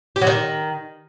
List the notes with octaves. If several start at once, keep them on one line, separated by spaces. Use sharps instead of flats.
G4
F#3
D#3